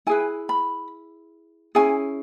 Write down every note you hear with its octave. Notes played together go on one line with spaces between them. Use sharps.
E4 G#4 B4 G#5
B5
C#4 E4 G#4 G#5